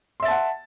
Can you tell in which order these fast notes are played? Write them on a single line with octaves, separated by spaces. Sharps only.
C6 E5 A6 A5 F#5